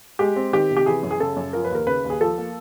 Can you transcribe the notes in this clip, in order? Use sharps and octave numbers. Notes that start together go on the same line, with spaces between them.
G#3 G4
C4
D#3 G4
C3
G4
E3 G#4
F#2
G#4
C#3 A4
F#2
F3 A#4
B4
D#2 A#4
C#3 B4
D#2
G#4
F3 A4
A#3